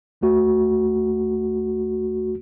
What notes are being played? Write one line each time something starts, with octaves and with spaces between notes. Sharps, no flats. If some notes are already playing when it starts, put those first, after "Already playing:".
G1 D#2 A3 F#4